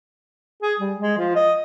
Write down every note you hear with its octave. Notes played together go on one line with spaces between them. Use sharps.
G#4
G3
G#3
F3
D#5